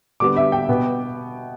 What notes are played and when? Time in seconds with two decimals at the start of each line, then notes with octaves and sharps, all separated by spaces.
0.20 D3 G3 B3 D6
0.36 E5
0.52 G5
0.68 B2 B3